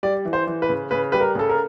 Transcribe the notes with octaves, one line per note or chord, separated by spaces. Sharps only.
G3 D5
E3
C5
E3
B4
C#3
C#3 B4
G3 B4
A#4
C#3 A4
A#4